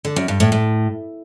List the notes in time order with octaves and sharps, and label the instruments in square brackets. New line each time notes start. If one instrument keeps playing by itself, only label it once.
[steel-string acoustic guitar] D3
F#2
G2
A2
A2